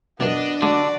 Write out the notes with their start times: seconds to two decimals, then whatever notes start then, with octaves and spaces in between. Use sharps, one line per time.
0.20 F#2 B2 B3 D4 D#5
0.62 D3 G#3 F#4 D5